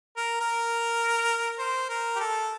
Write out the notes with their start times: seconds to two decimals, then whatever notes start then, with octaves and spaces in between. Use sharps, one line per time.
0.17 A#4
0.40 A#4
1.59 C5
1.89 A#4
2.16 G4
2.21 A4